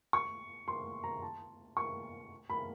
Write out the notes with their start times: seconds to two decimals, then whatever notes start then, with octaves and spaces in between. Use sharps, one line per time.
0.13 C#6
0.68 C6
1.04 A#5
1.22 A5
1.77 C#6
2.50 B5